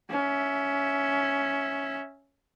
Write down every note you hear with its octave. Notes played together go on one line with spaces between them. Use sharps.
C#4 E5